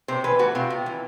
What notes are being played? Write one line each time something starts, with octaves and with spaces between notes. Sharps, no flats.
C3 C5
E3 B4
A3 F#4
C3 F4
C3
E3